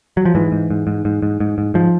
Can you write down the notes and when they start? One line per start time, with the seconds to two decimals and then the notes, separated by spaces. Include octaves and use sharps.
0.17 F#3
0.25 F3
0.35 G#2 E3
0.52 G#2
0.70 G#2
0.87 G#2
1.05 G#2
1.22 G#2
1.40 G#2
1.58 G#2
1.74 G#2 F3